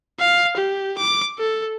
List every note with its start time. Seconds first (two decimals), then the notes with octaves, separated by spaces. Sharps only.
0.19 F5
0.57 G4
0.98 D6
1.39 A4